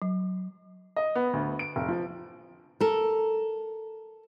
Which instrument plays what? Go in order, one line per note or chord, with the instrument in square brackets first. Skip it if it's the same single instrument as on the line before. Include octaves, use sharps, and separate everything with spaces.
[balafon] F#3
[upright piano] D#5
B3
D2
D7
F1
F3
[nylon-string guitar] A4 A#4